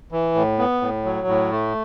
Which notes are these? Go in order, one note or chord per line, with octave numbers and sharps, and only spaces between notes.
E3
A2
B3
A2
F#3
A2
A3